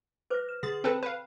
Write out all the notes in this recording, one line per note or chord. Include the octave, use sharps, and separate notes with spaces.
B4 C5 D6 F#6 A#6
F6 E7
D3 G#4 D#6 A6
C4 A4 B4 C5 G5
B4 F5